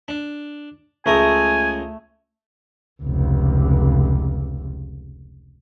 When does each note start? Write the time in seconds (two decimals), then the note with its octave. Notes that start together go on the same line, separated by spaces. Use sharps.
0.08 D4
1.06 C#2 A3 A#4 G#5 D#6
3.02 F1 C#2